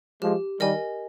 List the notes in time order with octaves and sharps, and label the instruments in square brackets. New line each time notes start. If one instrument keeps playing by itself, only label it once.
[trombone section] F3 G#3 [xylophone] G4
[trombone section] D#3 G3 [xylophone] A#4 D#5 G#5